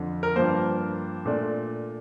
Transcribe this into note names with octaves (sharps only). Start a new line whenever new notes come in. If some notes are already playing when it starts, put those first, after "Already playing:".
Already playing: F2 D3 F3
A#4
G2 F3 A#3 C5
A#2 A3 D4